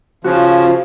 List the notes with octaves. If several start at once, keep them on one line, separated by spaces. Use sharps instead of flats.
C#3 F3 F#4